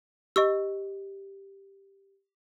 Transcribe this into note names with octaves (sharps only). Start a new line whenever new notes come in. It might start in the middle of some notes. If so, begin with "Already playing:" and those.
G4 D#5 C#6 E6